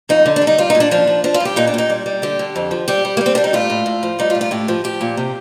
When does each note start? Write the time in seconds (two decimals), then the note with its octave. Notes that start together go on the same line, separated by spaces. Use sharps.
0.09 F2 D#4
0.26 D3
0.36 D4
0.42 G3
0.47 D#4
0.58 G3 F4
0.70 A#2 D#4
0.80 D4
0.91 F3 D4
1.07 F3
1.24 F3 D4
1.34 F4
1.40 G2
1.45 G4
1.56 A#2 D#4
1.67 D4
1.74 A#2 D#4
1.90 G3
2.06 G3
2.22 D3 G4
2.39 D3
2.56 F2
2.71 F3
2.88 G3 G4
3.05 G3
3.17 A#3
3.21 G3
3.26 C4
3.35 G3 D4
3.44 D#4
3.53 A2 F4
3.70 A2
3.86 A2
4.03 F3
4.19 G3 D#4
4.30 F4
4.35 A2
4.41 F4
4.51 A2 G4
4.68 F3
4.84 F3 G4
5.01 A#2
5.17 C3